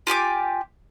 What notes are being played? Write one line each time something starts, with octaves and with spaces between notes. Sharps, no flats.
F4 G4 G#5 D6